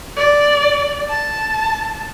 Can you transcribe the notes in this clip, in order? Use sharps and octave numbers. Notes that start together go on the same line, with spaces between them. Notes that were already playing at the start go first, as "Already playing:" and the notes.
D5
A5